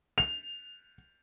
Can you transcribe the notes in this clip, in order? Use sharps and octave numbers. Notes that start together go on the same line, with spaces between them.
F7